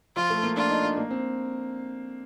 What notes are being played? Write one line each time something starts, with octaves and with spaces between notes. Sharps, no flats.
F3 F4
A3
A#3
D4 F4
D#4
D4
A#3
C4